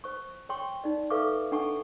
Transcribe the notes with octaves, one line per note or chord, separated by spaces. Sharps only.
C5 C#6
C#5 G5 C6 C#6
D#4 D5
A4 B4 E5 F5 C#6 D6
D4 A4 F#5 G#5 A5 C#6